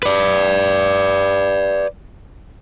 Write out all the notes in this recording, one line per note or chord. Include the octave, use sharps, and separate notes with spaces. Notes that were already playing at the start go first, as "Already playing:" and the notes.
B4 D5